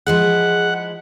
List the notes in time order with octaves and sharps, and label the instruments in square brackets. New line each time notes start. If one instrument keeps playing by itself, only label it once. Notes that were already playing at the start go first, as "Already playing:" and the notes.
[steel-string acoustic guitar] F3 G#3 E4 [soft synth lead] G#4 [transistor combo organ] F#5